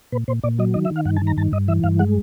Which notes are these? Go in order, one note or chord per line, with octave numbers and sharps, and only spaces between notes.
A#2 B4
A#2 C5
A#2 D5
F#3 D#5
D#3 D#5
E5
D#3
F5
G2 F#5
A5
D#3
A#5
G2 A5
G2 D#5
E3 E5
G2 F5
G#3 F#5